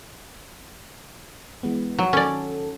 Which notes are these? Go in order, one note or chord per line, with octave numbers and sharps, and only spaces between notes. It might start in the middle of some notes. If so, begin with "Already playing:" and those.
E3 G#3 B3
F#3
D#3 C#4 A4 D5